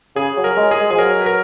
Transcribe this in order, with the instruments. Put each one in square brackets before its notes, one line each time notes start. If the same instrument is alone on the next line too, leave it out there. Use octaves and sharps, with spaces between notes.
[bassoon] C#3 [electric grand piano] G#4
[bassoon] F#3
[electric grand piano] A#4
[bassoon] G#3
[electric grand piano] G#4
[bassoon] G#3
[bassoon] F3 [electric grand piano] G#4
[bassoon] F#3 [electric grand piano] A#4
[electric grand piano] B4
A#4